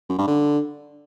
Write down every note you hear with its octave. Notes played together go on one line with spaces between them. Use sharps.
F#2
G2
D3